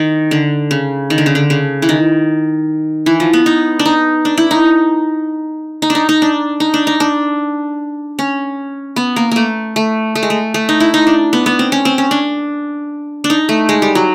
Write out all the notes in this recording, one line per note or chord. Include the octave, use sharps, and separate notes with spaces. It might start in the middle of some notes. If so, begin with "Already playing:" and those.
Already playing: D#3
D3
C#3
D#3
D3
C#3
D3
C#3
E3
D#3
E3
F3
B3
D#4
D4
D#4
D4
E4
D#4
D#4
D4
D#4
D#4
D4
D#4
D4
D#4
D4
C#4
B3
A#3
A3 A#3
A3
A3
G#3
A3
A3
D#4
E4
D#4
D4
B3
B3
C4
C#4
C4
C#4
D4
D4
D#4
A3
G#3
G3
F#3